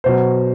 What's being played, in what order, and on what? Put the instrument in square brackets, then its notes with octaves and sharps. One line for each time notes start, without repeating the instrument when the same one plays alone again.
[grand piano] B2 F#3 C5